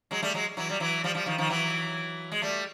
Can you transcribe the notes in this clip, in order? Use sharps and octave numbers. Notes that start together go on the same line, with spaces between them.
F#3 G#3
G3 A3
F#3 G#3
E3 F#3
G3
E3 F#3
F3 G3
F3 G3
D#3 F3
D#3 F3
E3 F#3
G#3
G3 A3